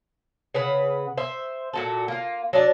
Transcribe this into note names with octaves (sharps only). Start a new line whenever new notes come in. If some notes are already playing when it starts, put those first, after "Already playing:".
C#3 B4 F#5
C5 E5
A#2 F#4 A4
A#3 F4
F#3 D4 D5